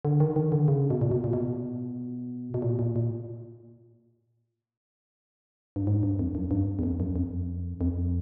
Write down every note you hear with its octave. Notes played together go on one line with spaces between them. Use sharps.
D3
D#3
D#3
D3
C#3
B2
A#2
B2
A#2
B2
B2
A#2
A#2
A#2
G2
G#2
G2
F2
F#2
G2
E2
F2
F#2
F2
F2